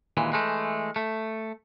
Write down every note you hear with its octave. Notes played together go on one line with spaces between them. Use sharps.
D#2 A#2 E3 G#3
E3 G#3 A3
A3